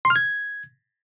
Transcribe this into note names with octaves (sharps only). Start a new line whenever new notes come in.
C6
F6
G#6